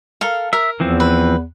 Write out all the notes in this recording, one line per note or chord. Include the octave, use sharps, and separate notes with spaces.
A4 A#4 F5
A#4 E5
E2 E3 F3 C4
B4